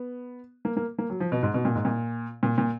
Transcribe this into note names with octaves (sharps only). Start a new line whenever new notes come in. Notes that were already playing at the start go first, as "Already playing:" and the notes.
Already playing: B3
A#3
A#3
A#3
F#3
F3
B2
G#2
B2
A#2
G#2
A#2
A#2
A#2